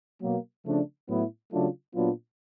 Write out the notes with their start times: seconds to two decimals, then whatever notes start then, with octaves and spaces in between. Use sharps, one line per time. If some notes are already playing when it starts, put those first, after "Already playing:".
0.21 B2 F#3 A#3
0.65 C#3 F3 A3 D4
1.08 A2 F#3 B3 E4
1.52 C#3 F#3 A3 D4 F4
1.94 A#2 F#3 B3 D4 F4